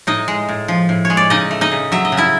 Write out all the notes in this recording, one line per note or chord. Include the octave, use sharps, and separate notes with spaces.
A2 D#4 D#5
G#3
A2
F3
A2
C#5
G#3
D5
C#3 D#4 D#5
A3
D#4 D#5
C#3
F#3 E5
D#5
C#3
E4 E5